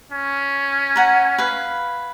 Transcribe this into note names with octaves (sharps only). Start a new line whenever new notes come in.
C#4
F#5 A#5
B4 F5